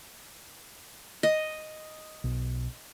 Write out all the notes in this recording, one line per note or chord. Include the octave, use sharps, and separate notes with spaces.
D#5
B1